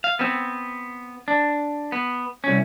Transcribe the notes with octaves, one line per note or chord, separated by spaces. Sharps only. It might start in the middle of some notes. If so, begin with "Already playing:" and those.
F5
B3 C4
D4
B3
C2 C#4